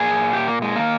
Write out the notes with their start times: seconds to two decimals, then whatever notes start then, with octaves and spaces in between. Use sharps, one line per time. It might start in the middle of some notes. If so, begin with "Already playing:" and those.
Already playing: A#2 G#4
0.33 G4
0.48 A#3
0.62 G#3
0.76 D#3 A#3